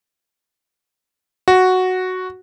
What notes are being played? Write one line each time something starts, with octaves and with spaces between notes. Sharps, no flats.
F#4